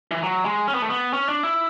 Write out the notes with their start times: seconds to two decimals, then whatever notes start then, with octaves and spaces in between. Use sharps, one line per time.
0.11 E3
0.23 F#3
0.45 G#3
0.68 C#4
0.75 B3
0.82 A3
0.89 B3
1.13 C#4
1.29 D4
1.43 E4